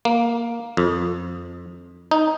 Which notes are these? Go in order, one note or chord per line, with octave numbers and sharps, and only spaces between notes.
A#3
F2
D#4